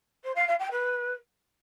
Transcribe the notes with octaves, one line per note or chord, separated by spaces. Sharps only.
C5
F5
F5
G5
B4